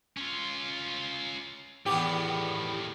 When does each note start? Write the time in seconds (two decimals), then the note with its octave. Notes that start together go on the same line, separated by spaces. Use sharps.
0.17 C#4 F4
1.86 E2 A2 D#3 B3 G4